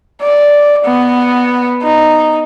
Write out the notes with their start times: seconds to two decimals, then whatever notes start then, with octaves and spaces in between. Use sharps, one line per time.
0.21 D5
0.85 B3
1.82 D#4